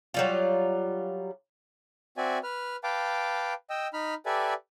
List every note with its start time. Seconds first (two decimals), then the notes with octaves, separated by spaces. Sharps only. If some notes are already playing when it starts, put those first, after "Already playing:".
0.14 F#3 G3 F4
2.17 C4 F#4 D5 E5 G#5
2.43 B4 F6
2.84 B4 F5 G5 A5 D6
3.70 D#5 G5 E6
3.94 D#4 B5 F6
4.26 G4 A4 B4 D5 E5 G#5